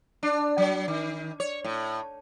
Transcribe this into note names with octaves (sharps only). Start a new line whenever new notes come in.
D4
F#3
D#3
C#5
A2